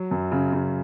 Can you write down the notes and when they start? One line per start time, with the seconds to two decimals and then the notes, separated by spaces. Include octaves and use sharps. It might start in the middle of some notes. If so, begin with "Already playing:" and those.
Already playing: F#3
0.11 F#2
0.32 C#3
0.52 C#3